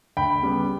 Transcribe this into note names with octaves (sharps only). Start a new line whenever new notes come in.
D2 G5 B5
C#3 G3 B3